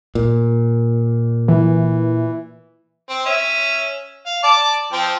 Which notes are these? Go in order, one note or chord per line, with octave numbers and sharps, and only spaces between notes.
A#2
E3
C4
C#4 E5
F5
D5 A5 D6
F3 C4 G5